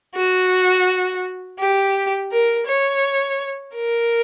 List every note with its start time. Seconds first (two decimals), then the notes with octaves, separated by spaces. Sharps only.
0.15 F#4
1.60 G4
2.31 A#4
2.67 C#5
3.75 A#4